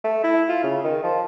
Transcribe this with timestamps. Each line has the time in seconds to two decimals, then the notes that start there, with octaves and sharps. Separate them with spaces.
0.04 A3
0.24 E4
0.49 F4
0.64 C#3
0.84 D#3
1.03 F3